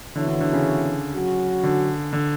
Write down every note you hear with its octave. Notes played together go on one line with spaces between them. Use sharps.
D3 E3 B3 F#4 C#5 E5
D3
D3
C#3
F#3 C#4 F#4
D3
D3